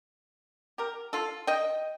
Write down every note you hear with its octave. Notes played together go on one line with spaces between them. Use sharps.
G4 A#4
F4 A4
D#5 G5